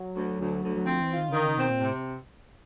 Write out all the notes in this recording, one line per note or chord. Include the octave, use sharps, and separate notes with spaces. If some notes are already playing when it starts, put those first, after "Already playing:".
Already playing: F#3
D2
D2
D2
F#3
F3 C4
E3
F4
D#3
C#3
D3 D#3
C#3
B2 C4
A#2
A2 C3